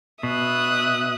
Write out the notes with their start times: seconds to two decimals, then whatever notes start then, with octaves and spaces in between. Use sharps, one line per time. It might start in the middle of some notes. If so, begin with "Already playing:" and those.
0.23 B2 E5 D#6 F#6